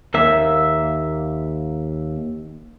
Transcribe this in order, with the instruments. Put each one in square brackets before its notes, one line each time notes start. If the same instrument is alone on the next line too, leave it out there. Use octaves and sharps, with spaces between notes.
[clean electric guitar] D#2 A#3 E5